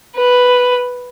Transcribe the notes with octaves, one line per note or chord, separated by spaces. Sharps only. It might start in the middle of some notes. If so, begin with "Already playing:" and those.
B4